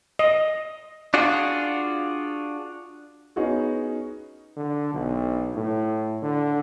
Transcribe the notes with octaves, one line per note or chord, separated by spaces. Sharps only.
D#5
D4 F4 F#4 G#4
B3 C#4 D#4 F#4 G#4
D3
B1
A2
D3